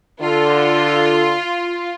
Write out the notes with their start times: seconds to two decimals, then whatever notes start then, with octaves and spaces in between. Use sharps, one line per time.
0.21 D3 F4 A4